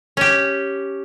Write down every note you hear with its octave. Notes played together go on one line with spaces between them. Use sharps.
C#4 G4